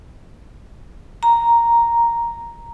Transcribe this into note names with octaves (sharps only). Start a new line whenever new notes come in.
A#5